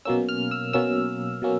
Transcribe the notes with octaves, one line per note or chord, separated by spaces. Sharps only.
B2 F#3 A#3 C#4 E6
F6
E6
B2 F#3 A#3 C#4 E6
B2 F#3 A#3 C#4